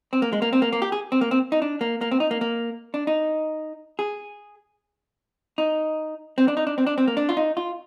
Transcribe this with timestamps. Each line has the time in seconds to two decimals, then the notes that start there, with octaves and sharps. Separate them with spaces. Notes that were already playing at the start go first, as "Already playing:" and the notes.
0.13 C4
0.22 A#3
0.33 G#3
0.42 A#3
0.53 C4
0.62 A#3
0.73 A#3
0.82 G4
0.92 G#4
1.12 C4
1.21 A#3
1.31 C4
1.52 D#4
1.62 D4
1.81 A#3
2.01 A#3
2.11 C4
2.20 D#4
2.31 A#3
2.41 A#3
2.94 D4
3.07 D#4
3.99 G#4
5.58 D#4
6.38 C4
6.48 D4
6.57 D#4
6.67 D4
6.78 C4
6.87 D4
6.98 C4
7.08 A#3
7.17 D4
7.29 F4
7.37 D#4
7.57 F4